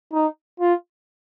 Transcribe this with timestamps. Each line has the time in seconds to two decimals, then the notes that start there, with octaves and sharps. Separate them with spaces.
0.13 D#4
0.60 F4